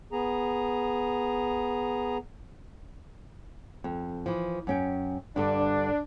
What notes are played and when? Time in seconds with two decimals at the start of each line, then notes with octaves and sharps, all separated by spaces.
0.12 B3 G#4 A#5
3.84 F2
4.26 E3 F3
4.67 F#2 C#4 G5
5.36 G2 D3 D4